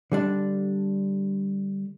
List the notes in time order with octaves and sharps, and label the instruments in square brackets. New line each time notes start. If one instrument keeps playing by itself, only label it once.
[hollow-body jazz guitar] D3 G3 D4